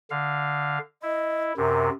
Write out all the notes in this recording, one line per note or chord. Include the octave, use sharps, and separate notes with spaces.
D3 F5
E4 D#5
F#2 C3 A#4